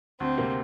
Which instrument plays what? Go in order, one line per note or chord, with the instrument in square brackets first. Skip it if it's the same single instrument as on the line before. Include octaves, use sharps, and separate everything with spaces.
[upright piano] D2 [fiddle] C4
[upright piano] C3 A#3